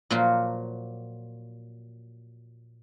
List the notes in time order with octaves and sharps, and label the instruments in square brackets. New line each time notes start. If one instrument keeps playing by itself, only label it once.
[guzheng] A#2 F3 F#3 A#3 F4 F#4